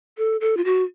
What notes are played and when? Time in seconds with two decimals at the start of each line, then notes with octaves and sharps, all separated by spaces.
0.18 A4
0.41 A4
0.57 F4
0.65 F#4